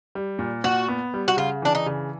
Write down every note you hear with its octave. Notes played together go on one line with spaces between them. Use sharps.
G3
A#2
A#2 F#4
B3
G3
F#4
C#3 F4
E3 D4
D#4
C#3